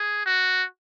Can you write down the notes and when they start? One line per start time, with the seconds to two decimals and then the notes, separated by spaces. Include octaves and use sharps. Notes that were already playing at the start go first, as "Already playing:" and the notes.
Already playing: G#4
0.26 F#4